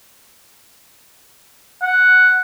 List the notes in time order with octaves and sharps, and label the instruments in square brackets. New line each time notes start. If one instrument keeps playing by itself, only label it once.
[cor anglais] F#5